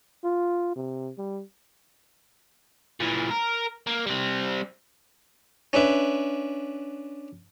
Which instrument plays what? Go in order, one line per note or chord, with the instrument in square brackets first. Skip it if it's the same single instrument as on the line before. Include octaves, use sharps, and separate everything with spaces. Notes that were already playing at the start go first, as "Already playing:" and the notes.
[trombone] F4
C3
G3
[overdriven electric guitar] A#2 E3
A#4
A#3
G3 C4
[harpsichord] C#4 D4 B4 E5